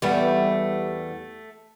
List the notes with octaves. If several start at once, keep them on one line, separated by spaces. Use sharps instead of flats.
E2 G3 A3 B3